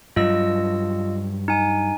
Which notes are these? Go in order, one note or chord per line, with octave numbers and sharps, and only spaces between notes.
G2 F#3 F4 D#5 E6
D#4 G#5